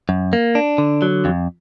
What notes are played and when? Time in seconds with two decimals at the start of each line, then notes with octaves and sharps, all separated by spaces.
0.09 F#2
0.33 A#3
0.55 D4
0.78 D3
1.02 F#3
1.25 F2